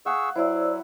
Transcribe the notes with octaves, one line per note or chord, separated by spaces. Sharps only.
G#4 F5 F#5 C#6 E6
F#3 E4 C5 D5 E6